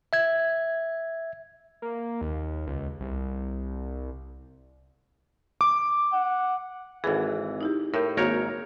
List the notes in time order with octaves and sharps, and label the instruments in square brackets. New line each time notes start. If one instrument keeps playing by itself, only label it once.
[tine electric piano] E5 G#6
[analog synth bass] A#3
D#2
C#2
C2
[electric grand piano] D6
[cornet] F#5
[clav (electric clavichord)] G#1 E3 [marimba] G#4 A4 F#5
[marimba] D#4 E4 G4
[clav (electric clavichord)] A2 [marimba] A#4 E5 G6
[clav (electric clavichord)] G#1 A#4 C#5 [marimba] A#3 F#4 G6